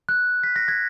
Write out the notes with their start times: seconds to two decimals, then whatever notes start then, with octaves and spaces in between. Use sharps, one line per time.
0.09 F#6
0.44 B6
0.56 A#6
0.68 G#6